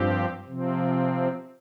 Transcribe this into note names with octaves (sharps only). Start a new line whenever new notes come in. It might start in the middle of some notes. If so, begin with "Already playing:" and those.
Already playing: G2 F3 C4 G4
C3 F3 C4